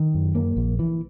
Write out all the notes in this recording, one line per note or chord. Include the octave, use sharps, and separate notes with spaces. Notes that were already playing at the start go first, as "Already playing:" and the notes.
Already playing: D#3
F#2
A#3
A#1
E3